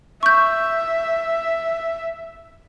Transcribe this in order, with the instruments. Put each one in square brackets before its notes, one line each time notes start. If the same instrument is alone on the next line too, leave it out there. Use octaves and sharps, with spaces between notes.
[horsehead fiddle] E5 [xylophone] C#6 G6